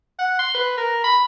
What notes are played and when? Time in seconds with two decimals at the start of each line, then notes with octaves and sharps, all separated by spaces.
0.19 F#5
0.39 C6
0.55 B4
0.78 A#4
1.04 B5